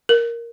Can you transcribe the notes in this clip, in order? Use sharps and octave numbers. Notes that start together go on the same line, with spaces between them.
A#4